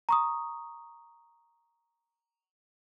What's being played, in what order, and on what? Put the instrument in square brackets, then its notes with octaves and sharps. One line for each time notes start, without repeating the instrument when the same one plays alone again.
[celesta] A#5 C#6 D#6